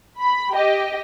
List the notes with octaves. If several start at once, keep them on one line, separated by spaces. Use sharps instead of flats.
B5
G4 D#5